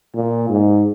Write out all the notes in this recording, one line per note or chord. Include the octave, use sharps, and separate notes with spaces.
A#2
G#2